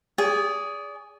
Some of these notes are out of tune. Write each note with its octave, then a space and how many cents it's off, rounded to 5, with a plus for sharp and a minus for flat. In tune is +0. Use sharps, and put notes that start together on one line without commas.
G#4 +0 D5 -30